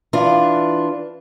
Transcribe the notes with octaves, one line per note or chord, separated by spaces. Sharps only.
E3 D4 F4